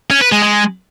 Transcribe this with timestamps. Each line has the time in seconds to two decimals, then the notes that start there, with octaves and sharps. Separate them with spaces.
0.10 C#4
0.21 B4
0.32 G#3
0.42 G#3